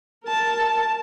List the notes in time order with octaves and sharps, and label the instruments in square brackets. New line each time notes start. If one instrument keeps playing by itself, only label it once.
[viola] A#4 A5